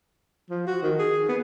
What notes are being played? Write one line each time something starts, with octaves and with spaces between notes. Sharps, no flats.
F3
F#4
D#3
G#4
B3